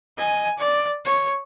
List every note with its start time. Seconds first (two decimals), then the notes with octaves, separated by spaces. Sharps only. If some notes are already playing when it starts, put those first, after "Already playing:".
0.18 D#5 G#5
0.58 D5
1.05 C#5